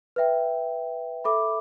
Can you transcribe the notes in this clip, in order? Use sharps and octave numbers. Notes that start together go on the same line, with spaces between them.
B4 E5 G5
A4 E5 B5 D6